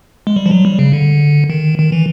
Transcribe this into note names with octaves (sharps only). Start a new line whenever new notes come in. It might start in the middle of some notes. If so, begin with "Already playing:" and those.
G#3
G3
F3
F#3
G3
C#3
D3
D#3
D#3
E3